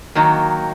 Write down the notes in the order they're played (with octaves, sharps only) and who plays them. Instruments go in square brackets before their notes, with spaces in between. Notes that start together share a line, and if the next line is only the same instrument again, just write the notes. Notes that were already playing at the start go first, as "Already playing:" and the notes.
[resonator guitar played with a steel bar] D#3 F#3 A#3